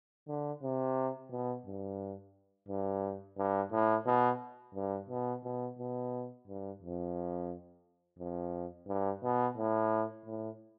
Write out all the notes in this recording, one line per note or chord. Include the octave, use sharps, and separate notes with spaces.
D3
C3
B2
G2
G2
G2
A2
B2
G2
B2
B2
B2
G2
F2
F2
G2
B2
A2
A2